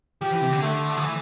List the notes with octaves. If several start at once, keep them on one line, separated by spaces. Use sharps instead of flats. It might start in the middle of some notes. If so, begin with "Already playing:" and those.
F3 G4
E3
C3
D3
A3
F3
E3